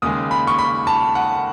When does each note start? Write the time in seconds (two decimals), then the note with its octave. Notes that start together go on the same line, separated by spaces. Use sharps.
0.02 D#2 C#3 G#3 D#6
0.31 B5
0.47 C#6
0.59 B5
0.87 A5
1.15 F#5